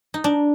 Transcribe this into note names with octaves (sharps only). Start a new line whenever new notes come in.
D#4
D4